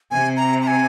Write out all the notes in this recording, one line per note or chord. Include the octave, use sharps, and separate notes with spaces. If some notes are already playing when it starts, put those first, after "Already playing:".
C3 G#5
A#5
A#5
G#5